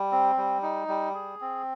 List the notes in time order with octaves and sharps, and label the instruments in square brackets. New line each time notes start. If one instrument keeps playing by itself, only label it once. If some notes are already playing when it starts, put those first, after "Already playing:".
Already playing: [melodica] G3
C4
G3
D#4
G3
G#4
C4